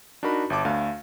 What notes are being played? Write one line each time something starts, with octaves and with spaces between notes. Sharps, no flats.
D4 D#4 F#4 A#4 B5
G1 E5 A5 D6
D2 A3 D4 F5